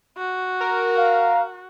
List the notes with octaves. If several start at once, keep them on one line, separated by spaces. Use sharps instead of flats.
F#4
A#4
F5